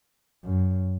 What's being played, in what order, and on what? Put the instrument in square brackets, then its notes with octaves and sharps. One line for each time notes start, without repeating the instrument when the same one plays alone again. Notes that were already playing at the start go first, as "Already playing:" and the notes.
[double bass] F#2